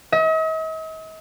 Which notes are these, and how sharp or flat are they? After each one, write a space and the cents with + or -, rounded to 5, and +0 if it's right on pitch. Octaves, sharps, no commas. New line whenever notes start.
D#5 +45